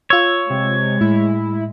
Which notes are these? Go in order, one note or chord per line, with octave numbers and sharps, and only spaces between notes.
F4 C#5 E6
C3 G#3
A2 E4